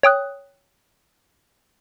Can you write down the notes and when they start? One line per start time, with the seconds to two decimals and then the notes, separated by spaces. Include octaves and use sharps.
0.03 C#5 G5 D#6 F#6